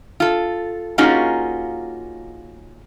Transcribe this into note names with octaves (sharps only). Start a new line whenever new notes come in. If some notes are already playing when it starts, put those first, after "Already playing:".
F4 A4
A#3 C#4 D#4 F4 F#4 G#4